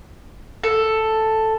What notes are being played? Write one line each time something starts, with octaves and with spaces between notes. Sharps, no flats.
A4